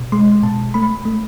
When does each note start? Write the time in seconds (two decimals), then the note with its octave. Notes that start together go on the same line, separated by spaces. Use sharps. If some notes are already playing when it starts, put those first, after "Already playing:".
Already playing: B2
0.12 G#3 C6
0.43 B2 A5
0.74 A3 B5
1.05 A3